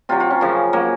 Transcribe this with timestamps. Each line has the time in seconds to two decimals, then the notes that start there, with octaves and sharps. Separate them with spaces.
0.09 C3 F#3 F4
0.20 F4
0.31 C#4
0.41 F#2 C#3 F3
0.73 F#3 A#3